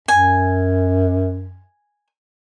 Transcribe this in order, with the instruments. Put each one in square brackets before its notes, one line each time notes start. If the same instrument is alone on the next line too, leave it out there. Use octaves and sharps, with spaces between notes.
[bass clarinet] F#2 [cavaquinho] G#5